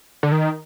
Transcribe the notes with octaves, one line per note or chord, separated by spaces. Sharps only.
D3
D#3